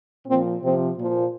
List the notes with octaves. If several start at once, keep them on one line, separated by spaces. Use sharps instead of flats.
A#2 F3 C4
C3 F3 C4
A#2 F3